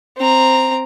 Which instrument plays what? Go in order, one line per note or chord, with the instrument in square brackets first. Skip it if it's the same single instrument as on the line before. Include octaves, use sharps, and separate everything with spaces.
[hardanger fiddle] C4 A#5